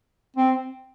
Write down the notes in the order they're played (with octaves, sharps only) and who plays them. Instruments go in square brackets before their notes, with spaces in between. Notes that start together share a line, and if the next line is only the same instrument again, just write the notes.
[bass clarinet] C4